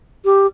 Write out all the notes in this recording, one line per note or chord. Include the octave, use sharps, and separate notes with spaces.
G4